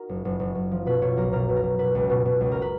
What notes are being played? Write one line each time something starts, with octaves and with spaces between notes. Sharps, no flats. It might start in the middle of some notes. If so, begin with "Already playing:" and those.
Already playing: D#4 F#4 A#4
F#1
F#1
F#1
F#1
F3
B2 B4
B2 C#5
B1 A#4
B2 A#4
B2
A#4
B2
B2 B4
C#2
B2
B2
C#2
A#4
B4